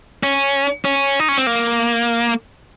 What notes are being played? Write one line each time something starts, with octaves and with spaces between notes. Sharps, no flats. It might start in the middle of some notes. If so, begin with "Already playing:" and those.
C#4
C#4
D#4
C#4
C4
A#3